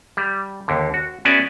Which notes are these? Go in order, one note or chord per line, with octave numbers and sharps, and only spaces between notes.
G3
D#2 D3
F#4
B3 C#4 F#4 D5 E5 G#5